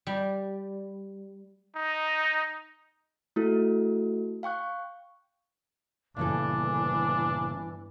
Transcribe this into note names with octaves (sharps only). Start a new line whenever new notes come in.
G3
D#4
A3 E4 F#4 A4
F5 G5 C#6 F#6
G1 A#2 C#3 E3 D4 A4